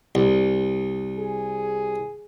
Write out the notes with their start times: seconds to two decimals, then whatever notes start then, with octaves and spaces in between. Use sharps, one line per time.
0.15 C2
1.18 G#4